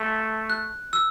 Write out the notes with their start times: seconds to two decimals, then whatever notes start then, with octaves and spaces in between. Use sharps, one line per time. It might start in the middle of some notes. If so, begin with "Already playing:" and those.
Already playing: A3
0.50 F#6
0.93 E6